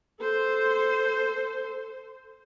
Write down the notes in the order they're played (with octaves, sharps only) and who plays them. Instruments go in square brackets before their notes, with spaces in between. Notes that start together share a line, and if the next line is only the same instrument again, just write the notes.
[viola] A4 C5